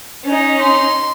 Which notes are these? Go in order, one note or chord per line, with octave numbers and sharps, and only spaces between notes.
C#4 D#4
C6